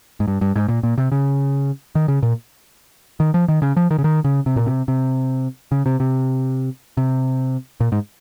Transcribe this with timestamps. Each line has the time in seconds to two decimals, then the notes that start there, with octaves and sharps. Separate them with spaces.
0.20 G#2
0.28 G2
0.41 G2
0.56 G#2
0.69 A#2
0.83 A#2
0.98 C3
1.12 C#3
1.95 D#3
2.08 C#3
2.23 A#2
3.20 D#3
3.34 F3
3.48 D#3
3.62 C#3
3.77 F3
3.91 D#3
3.98 C#3
4.04 D#3
4.24 C#3
4.46 C3
4.56 A#2
4.66 C3
4.88 C3
5.72 C#3
5.86 C3
6.00 C3
6.97 C3
7.80 A#2
7.92 G#2